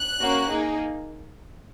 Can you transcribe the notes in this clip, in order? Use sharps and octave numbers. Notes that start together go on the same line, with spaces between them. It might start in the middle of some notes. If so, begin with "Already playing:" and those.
Already playing: F#6
A#3 C#4 F#4
A#3 D#4 G#4